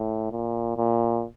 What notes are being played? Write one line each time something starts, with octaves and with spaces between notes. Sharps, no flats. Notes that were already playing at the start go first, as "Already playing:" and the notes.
Already playing: A2
A#2
A#2